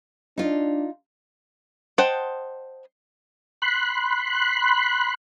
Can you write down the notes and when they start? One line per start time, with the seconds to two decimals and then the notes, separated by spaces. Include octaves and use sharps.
0.38 D4 D#4 F4
1.98 C5 D#5 F#5 G5 A5
3.62 B5 C6 F#6